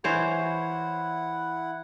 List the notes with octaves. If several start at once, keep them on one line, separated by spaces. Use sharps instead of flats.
E3 E4 C5 C#5 F#5